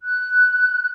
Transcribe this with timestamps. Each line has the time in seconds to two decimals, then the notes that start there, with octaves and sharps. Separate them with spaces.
0.01 F#6